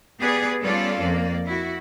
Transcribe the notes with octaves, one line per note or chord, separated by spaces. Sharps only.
B3 G4 G#4 B4 D5
G3 B3 C#4 F4 A4 D5
F2 A#3 D5
E4 F#4